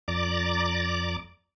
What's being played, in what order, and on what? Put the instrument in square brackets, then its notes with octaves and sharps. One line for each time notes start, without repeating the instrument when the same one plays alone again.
[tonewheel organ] F2 D5 A#5 D6 A6